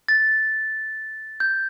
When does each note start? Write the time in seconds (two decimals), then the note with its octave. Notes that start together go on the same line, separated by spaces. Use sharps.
0.08 A6
1.40 G6